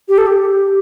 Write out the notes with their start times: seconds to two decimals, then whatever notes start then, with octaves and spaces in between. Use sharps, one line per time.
0.09 G4
0.18 A4
0.27 G4